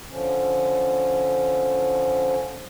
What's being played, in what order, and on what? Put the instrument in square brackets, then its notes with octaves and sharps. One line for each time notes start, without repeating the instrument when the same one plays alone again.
[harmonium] D3 F3 C#4